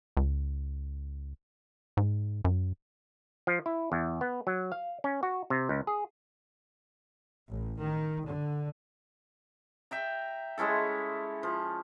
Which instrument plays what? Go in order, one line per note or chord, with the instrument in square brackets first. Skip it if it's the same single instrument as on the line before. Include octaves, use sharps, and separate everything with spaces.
[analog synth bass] C#2
G#2
F#2
[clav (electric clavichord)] F3
E4
E2
B3
F#3
F5
C#4
F#4
C3
C#2
G#4
[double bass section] A1
D#3
D3
[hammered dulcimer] E5 G5 A#5
G#3 C#4 E4 A4
F3